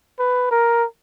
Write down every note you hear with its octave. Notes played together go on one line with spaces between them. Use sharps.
B4
A#4